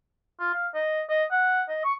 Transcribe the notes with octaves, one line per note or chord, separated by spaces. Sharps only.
F4
F5
D#5
D#5
F#5
D#5
C#6